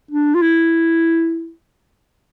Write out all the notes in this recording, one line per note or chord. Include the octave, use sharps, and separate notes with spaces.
D4
F4
E4